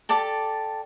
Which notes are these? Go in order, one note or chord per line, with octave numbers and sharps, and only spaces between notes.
G4 A4 D5 A5